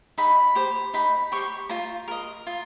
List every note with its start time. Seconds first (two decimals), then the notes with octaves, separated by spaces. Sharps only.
0.18 D#4 B5
0.55 G4 C5
0.94 D#4 B5
1.32 G4 C5 C#6
1.70 F4 A#5
2.08 A#4 D#5
2.47 F4